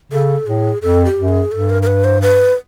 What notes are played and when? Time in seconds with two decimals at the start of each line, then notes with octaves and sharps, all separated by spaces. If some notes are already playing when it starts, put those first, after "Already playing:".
0.12 C#3 A4
0.46 A2 G#4
0.82 F2 A4
1.05 G4
1.18 F#2
1.28 G#4
1.52 G2 A4
1.70 A#4
1.83 A#4
1.87 B4
2.04 C5
2.22 B4